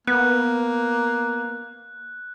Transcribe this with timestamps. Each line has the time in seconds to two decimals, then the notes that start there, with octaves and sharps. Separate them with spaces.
0.07 A#3 B3 F#6